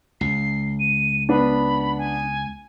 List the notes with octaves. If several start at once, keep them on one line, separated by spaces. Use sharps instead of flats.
C#2 C7
D#7
B3 D4 B5
G#5